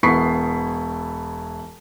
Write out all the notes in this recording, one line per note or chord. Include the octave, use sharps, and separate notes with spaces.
E1 B3 E4 C#6 B6 C7